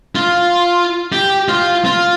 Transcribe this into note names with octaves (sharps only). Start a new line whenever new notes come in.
F4
G4
F4
F4